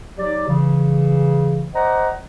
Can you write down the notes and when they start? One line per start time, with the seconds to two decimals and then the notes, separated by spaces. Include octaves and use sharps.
0.19 F#3 D#4 G4 D5
0.48 C#3 E3
1.75 C5 D5 D#5 F#5 A#5